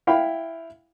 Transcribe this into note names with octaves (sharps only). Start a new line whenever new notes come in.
E4 F5 G5 B5